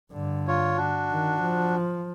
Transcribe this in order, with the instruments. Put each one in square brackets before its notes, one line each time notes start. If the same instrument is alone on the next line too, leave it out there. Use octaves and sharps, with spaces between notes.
[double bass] G2 D3
[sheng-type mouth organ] F4 C#5
D4 F#4
[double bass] D#3
F3